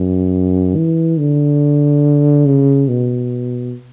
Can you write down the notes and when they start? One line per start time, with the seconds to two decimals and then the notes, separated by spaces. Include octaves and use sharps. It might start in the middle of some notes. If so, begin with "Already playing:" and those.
Already playing: F#2
0.76 E3
1.18 D3
2.46 C#3
2.88 B2